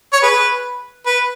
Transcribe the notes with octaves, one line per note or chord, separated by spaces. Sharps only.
C#5
G#4 B4
B4